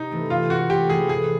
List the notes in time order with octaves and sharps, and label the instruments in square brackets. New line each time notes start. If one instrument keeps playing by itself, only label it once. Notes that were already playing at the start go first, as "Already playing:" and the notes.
Already playing: [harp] C3 [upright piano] D#4
[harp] E3 A3 C4
[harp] C3 [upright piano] F4
[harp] E3 A3 C4 [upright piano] F#4
[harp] C3 [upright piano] G4
[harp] E3 A3 C4 [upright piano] G#4
[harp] A1 [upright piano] G#4